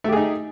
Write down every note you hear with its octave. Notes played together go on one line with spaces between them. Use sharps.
A3 D#4 G4 G#4